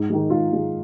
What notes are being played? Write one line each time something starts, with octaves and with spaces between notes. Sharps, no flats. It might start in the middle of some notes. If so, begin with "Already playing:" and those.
Already playing: G#2
D#3 G#3
G#2 F4
D#3 G#3